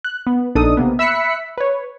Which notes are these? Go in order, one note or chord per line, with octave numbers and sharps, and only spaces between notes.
F#6
B3
A#1 D4 D#4 A4 D#6
C3 A#3 B3
E5 B5 E6 F#6 B6 C#7
B4 C#5